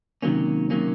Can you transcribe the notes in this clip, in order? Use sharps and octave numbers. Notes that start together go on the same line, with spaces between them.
C3 D#3 F#3 A#3 C#4
C3 D#3 F#3 A#3 C#4